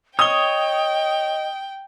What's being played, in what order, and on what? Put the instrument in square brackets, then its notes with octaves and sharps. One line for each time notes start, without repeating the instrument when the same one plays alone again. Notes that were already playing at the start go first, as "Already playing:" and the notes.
[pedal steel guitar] C#5 [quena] D#5 [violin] G5 [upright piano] D#6 G7